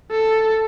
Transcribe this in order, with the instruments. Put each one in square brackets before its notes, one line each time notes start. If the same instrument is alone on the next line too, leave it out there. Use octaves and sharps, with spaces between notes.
[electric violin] A4